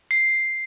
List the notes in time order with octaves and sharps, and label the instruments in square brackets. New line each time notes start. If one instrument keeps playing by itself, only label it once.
[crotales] C7